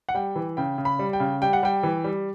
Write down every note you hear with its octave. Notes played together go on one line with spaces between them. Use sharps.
F#5
G3 G5
E3
C#3 G5
C#3
B5
G3
G5
C#3
G3 G5
F#5
G3 G5
E3
G3